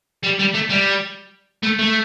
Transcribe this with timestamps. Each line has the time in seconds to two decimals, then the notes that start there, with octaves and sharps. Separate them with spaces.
0.23 G3
0.39 G3
0.54 A3
0.69 G3
1.63 A3
1.79 A3